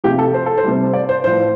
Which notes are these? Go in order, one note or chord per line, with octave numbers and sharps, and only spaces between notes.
C3 F3 G4
A4
C5
A4
C5
C3 G3
D5
C5
A2 F3 C5